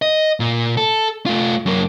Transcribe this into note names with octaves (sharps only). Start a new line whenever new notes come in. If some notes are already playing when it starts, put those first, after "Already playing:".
D#5
A#2
A4
A3 F4
F#2 A#3